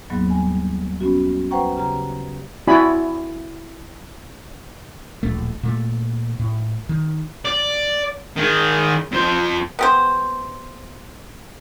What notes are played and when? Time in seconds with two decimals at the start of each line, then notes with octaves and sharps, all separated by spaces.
0.10 D#2 G#2 F#3 A#3 B3
0.30 G3 G#5
1.00 B3 C#4 F#4
1.51 B4 C5 F#5 G5 A#5 C#6
1.77 C#3 G4 A#5
2.67 C4 E4 F#4 D5 G#5 B5
5.23 D1 A#1 A3
5.63 A#2 A3
6.39 A2
6.89 D#3
7.45 D5
8.37 D#3 G#4
9.12 F2 C5
9.79 B3 G4 C5